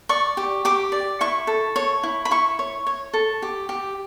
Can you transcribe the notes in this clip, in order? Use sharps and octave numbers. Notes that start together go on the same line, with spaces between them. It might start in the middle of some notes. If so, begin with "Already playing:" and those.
D5 C#6
G4
G4 D6
D5
E4 C#6
A4
C#5
E4
B5
E4 C#6
C#5
C#5
A4
G4
G4